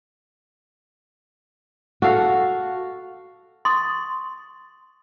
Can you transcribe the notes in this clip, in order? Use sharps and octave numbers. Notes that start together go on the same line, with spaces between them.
F#4 A4 F5
C6 C#6 D#6 A6